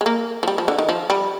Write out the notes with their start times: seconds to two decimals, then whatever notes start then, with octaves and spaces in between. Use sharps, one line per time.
0.01 G#3
0.06 A#3
0.43 F3
0.48 G3
0.58 F3
0.68 D3
0.78 D#3
0.89 F3
1.10 G3